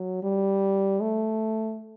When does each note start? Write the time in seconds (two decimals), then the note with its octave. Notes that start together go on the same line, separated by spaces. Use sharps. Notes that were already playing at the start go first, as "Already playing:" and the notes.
Already playing: F#3
0.23 G3
1.01 A3